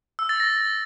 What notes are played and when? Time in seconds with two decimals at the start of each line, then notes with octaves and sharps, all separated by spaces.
0.19 E6
0.29 A6
0.40 A#6